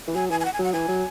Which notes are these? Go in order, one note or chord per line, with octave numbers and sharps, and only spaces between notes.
E3
F#3 G#5
E3 G#5
G#5
F#5
G#5
F#3 F#5
E3 G#5
F#3